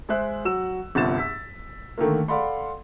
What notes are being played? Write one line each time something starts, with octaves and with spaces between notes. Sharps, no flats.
G#3 G#4 C5 E5 F#6
F#3 F#4 E6 E7
G1 C2 F3 A6 E7
E6 B6
D3 D#3 A3 A#3
A4 D5 F5 F#5 B5 C6